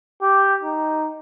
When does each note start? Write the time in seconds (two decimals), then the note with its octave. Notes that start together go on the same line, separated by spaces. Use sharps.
0.22 G4
0.63 D#4